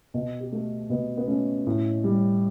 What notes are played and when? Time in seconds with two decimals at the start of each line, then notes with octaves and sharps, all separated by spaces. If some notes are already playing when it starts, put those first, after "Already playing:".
0.14 B2 F#4
0.40 G4
0.52 A3
0.90 B2 B3
1.17 B3
1.28 A3 C#4
1.67 A2
2.04 G3